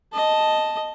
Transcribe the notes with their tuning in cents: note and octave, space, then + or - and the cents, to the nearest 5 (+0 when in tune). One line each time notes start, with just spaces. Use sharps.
D#5 +0 A5 +0